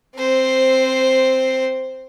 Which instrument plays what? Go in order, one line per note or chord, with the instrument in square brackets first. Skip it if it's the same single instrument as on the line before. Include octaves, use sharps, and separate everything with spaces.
[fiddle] C4 C5